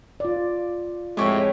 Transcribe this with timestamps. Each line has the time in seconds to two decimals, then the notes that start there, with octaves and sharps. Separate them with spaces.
0.20 F4 D5
1.17 F2 A2 G#3 G4 C#5